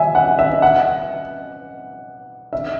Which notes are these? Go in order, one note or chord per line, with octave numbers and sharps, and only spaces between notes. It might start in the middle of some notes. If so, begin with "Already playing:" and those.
Already playing: E5 G#5
F#5
E5
F#5
E5